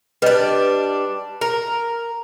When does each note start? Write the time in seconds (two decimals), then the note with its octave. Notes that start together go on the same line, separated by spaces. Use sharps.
0.22 G3 D4 B4 D#5
1.41 A#4